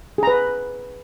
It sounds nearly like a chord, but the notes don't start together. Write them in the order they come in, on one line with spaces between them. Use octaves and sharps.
G#4 A#5 B4